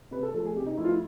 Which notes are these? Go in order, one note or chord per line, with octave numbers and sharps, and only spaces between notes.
C3 B4
A4
F3 A3 A4
G#4
C3 G4
D#4
F3 A3 E4
F4
E4